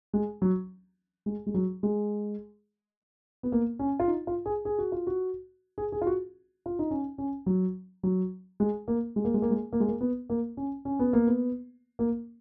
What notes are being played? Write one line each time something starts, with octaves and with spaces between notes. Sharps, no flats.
G#3
F#3
G#3
G#3
F#3
G#3
B3
A#3
C#4
F4
D#4
F4
G#4
G#4
F#4
F4
F#4
G#4
G#4
F4
F#4
F4
D#4
C#4
C#4
F#3
F#3
G#3
A#3
G#3
A#3
G#3
A#3
G#3
A#3
G#3
A#3
B3
A#3
C#4
C#4
B3
A#3
B3
A#3